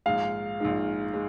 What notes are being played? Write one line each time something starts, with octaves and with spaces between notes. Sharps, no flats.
A#1 G#2 D#3 G#3 F5
A#1 G#2 D#3 G#3
G#3